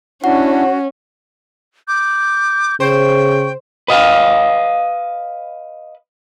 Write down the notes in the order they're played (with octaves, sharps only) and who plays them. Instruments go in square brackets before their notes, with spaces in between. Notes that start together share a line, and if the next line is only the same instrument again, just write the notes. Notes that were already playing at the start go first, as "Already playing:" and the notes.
[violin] C#4 [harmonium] D4 E4 [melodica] F#4 [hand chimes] F#5
[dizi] D6 [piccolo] G6
[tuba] C#3 [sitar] C5 [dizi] G5 [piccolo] C#6
[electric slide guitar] B4 D#5 F5